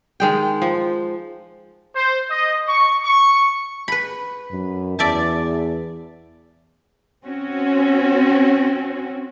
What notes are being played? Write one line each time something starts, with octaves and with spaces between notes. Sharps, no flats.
D#3 G#3 G5
F3
C5
D#5
C#6
C#6
B4 B5
F#2
E2 D5 E5 A5
C4 C#4 F#4